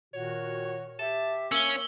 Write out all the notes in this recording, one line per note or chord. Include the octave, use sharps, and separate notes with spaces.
A#2 D#3 F#4 C#5
G4 E5 A5
A#3 C#4 E6 G7